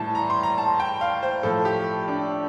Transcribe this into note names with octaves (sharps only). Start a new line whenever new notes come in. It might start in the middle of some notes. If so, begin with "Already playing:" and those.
Already playing: A2 E3 G3 A5
A#5
C6
A#5
A5
G5
F5
C5
A2 F3 A4
G4
D4